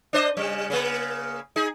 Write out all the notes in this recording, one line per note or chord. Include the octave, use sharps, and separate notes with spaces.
D4 C5 D#5
C#3 G3
C#3 A#3
D#4 G#4